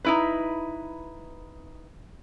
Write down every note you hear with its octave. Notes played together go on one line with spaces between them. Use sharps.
D#4 E4 B4